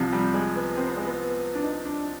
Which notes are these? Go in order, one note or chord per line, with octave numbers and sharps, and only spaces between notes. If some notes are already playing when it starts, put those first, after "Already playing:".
Already playing: C2 C3 F3
G3
G#3
B3
C4
B3
G#3
B3
D4
D#4
D4